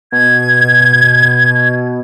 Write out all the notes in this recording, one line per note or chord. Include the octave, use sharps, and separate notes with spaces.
B2 G#6